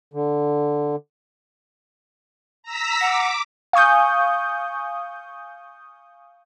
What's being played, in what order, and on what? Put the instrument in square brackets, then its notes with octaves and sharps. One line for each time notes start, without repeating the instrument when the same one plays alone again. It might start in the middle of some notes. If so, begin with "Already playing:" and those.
[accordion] D3
[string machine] A#5 E6 B6
[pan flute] F#5 [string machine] D6
[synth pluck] F5 G#5 C#6 D#6 G6